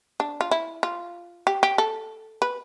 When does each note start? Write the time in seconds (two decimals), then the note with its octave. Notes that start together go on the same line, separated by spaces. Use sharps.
0.20 D4
0.41 F4
0.51 E4
0.83 F4
1.47 G4
1.63 G4
1.78 A4
2.42 B4